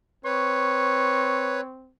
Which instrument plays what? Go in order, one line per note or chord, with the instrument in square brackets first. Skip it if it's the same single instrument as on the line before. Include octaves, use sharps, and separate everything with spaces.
[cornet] C4 [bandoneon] B4 C#5 [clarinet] C#6